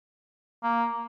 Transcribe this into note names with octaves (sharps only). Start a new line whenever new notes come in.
A#3